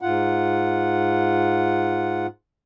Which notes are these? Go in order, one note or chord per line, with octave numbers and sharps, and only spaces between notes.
G#2 F4 F#5